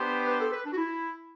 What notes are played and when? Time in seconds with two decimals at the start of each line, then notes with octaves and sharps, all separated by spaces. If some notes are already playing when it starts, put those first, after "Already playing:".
Already playing: B3 D4 G4 C5
0.27 B4
0.40 A4
0.52 B4
0.65 D4
0.72 F#4
0.77 E4